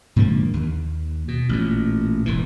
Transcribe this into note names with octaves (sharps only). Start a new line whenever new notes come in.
G#2 D3 F3 A#3
D#2
B2
A1 A#2
E1 A2 E3